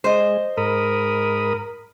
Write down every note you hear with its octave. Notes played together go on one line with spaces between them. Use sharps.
G#3 C5 D#5
G#2 A#4 B5 D#6